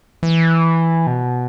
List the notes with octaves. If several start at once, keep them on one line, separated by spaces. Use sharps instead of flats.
E3
B2